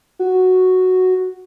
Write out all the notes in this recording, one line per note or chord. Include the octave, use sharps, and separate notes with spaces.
F#4